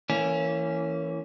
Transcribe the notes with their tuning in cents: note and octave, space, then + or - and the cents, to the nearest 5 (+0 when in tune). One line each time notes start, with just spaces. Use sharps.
E3 +0 A#3 -25 C#4 +0